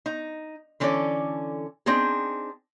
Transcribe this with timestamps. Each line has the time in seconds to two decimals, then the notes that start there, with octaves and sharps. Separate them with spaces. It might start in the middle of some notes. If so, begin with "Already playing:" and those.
0.06 D#4
0.80 D3 E3 C#4 A4 C#5 D5
1.86 C4 D4 D#4 G#4